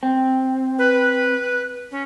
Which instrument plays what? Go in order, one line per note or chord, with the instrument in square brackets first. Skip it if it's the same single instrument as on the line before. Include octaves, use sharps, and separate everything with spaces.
[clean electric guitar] C4
[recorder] B4
C#4